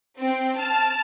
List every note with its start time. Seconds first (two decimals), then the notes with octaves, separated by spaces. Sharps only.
0.18 C4
0.56 A5 F6